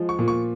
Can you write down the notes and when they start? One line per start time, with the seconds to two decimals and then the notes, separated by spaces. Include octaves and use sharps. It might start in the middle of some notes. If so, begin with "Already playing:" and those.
Already playing: F3 G#3
0.09 C#6
0.19 A#2
0.28 C#6